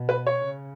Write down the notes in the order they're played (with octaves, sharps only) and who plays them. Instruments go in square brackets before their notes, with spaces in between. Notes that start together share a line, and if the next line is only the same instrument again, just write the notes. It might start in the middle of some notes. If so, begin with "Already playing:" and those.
Already playing: [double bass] B2
[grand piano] B4
C#5
[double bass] C#3